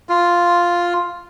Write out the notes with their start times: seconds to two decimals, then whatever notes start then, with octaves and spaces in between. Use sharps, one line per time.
0.09 F4